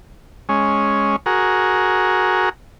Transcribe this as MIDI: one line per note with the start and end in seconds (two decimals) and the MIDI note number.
0.49 1.16 56
0.49 1.16 61
1.26 2.49 66
1.26 2.49 68
1.26 2.49 70